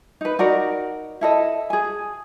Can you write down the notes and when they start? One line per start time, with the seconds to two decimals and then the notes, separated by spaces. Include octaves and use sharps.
0.21 D#4 B4
0.39 D#4 F#4 A#4 D5
1.21 E4 A4 D#5
1.70 G#4 G#5